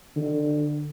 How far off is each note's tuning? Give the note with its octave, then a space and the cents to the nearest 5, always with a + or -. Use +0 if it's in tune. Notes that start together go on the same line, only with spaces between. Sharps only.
D3 +25